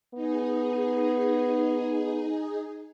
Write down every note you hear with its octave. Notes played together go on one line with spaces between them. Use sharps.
B3 D#4 G#4